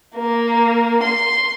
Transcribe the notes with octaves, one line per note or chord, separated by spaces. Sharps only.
A#3
C6